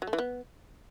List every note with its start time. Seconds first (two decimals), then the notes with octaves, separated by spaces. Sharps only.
0.02 F#3
0.07 A3
0.13 E3
0.19 B3